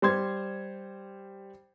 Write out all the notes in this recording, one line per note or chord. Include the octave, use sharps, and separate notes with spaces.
G3 C5 C6 G#6